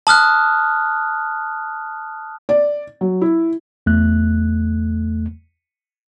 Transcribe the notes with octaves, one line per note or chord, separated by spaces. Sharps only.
A5 D#6 F6 F#6
D5
F#3
E4
E2 A3 F#6